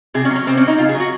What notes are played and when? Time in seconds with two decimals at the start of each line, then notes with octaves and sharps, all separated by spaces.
0.14 C3 G#4
0.25 C#4
0.30 F#3
0.36 C#4
0.47 C3 C4
0.57 C#4
0.63 F#3 D#4
0.78 C#3 F4
0.89 G#4
0.95 F#3
1.00 F#4